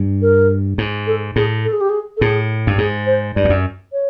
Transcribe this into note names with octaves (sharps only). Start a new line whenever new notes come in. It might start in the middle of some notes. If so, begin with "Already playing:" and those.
Already playing: G2
A#4
G#2
A4
A2 G#4
A4
G#4
G4
G#4
A4
A2 G#4
G2
G#2 G#4
C5
G2 D5
F2
F#2
C#5